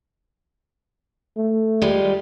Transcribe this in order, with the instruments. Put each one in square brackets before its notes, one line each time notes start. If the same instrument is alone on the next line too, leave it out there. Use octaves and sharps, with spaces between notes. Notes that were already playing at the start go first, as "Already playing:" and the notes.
[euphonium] A3
[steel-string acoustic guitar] G3 G#3 F4